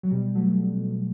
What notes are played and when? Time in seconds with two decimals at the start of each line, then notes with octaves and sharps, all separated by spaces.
0.03 F#3
0.11 B2 G3
0.27 B2
0.35 F#3 A3
0.43 B2
0.59 B2
0.75 B2
0.90 B2